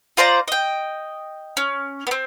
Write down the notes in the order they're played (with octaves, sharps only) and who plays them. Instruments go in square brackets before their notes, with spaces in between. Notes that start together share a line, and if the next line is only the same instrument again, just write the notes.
[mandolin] F4 C5 D5 A#5
D#5 G5
C#4
B3 C4